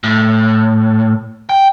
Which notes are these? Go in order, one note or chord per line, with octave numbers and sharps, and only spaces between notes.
A2
G5